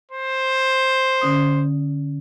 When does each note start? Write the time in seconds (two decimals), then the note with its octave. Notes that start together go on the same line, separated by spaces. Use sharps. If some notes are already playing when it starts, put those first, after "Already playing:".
0.11 C5
1.21 D3 C#4 D#6